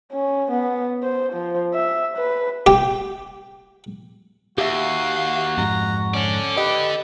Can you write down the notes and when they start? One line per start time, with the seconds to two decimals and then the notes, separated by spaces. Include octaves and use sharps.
0.12 C#4
0.51 B3
1.03 C5
1.32 F3
1.73 E5
2.16 B4
2.66 G4 G5
4.58 D#2 F#4 G4 E5 F5
5.58 F2 G#2 A#5
6.14 C#4 A4 D5
6.57 G4 B4 D#5